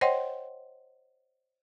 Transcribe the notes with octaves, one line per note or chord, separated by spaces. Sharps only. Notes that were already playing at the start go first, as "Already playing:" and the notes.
C5 C#5 D#5 F#5 G5 C6